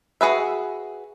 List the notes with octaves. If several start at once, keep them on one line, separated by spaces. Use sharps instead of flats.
F#4 G#4 B4 E5